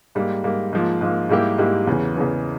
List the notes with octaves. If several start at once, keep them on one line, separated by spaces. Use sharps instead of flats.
G#2 G3 A#3
G#2 G3 A#3
G#2 F3 A#3
G#2 F3 A#3
G#2 G3 A#3 E4 G4
G#2 G3 A#3 E4 G4
E2 C#3 E3
E2 C#3 E3